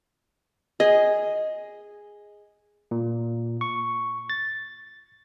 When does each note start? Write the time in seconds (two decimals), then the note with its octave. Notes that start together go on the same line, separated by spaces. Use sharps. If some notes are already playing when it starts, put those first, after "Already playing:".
0.80 G#4 D#5
2.91 A#2
3.61 C#6
4.30 A6